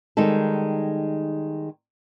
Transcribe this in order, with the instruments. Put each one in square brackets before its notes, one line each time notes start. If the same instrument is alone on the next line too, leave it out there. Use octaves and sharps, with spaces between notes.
[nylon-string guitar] D#3 G3 G#3 D#4 A4